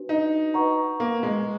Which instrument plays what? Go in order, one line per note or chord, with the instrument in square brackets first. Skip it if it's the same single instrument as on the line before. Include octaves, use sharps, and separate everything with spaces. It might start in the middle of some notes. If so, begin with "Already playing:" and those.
Already playing: [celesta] D4 F#4 B4
[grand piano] D#4
[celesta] B4 D#5 F#5 A#5 C#6
[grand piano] A#3
G#3